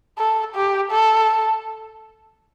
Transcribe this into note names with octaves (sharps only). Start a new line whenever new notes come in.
A4
G4
A4